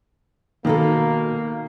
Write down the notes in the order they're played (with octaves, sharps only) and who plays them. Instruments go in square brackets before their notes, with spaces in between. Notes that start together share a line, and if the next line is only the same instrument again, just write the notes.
[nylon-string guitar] B2 D#4 A4 [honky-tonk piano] D#3 [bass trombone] A#3